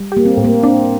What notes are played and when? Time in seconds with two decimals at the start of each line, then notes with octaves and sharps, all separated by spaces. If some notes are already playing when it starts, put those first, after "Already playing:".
Already playing: G3
0.12 A#3 G4
0.25 C4
0.37 A2
0.44 A#3
0.63 C4 D4